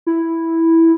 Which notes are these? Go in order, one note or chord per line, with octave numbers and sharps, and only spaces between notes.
E4